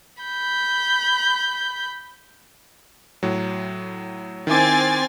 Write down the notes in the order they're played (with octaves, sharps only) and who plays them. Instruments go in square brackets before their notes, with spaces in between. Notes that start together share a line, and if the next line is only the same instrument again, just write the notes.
[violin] B5 G6
[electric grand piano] A2 F#3
[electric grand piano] D#3 E4 D6 [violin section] C4 G#5 A6